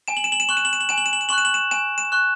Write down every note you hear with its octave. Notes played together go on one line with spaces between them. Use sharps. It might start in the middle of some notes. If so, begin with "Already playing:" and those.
G#5 E7
F#7
E7
F#7
E7
C#6 F#6 F#7
E7
F#7
E7
F#7
G#5 E7
F#7
E7
F#7
E7
C#6 F#6 F#7
E7
F#7
E7
G#5 E7
E7
C#6 F#6